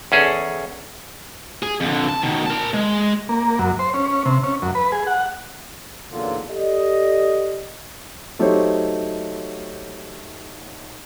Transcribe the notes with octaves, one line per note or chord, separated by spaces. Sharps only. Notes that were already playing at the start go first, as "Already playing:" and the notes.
E2 C#4 G#4 A4
G#4
F2 D3
A5
B2 D#3
A#4 A5
G#3
A#3
F#2
C5
C#4
C3
C#4
F#2
B4
G#4
F#5
B1 E2 A#2 D3 F#3 F4
G4 A4 D5 D#5
F#3 A3 D#4 G4 C5 C#5